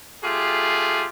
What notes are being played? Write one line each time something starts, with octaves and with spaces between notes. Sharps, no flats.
A3 F4 G4 G#4